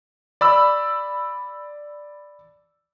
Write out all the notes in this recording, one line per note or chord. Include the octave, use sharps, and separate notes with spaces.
D5 B5 E6